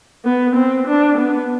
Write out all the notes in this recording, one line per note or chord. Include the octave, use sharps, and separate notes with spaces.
B3
C4
D4
B3